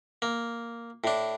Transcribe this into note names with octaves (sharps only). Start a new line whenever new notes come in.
A#3
A2 D4